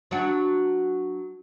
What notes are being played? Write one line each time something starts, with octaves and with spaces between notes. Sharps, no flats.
F#3 D4 F#4